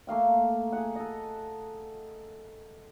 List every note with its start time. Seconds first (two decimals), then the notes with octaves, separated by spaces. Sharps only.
0.07 A3 A#3 F5 G5
0.72 G#4 F#5
0.95 A4 D#5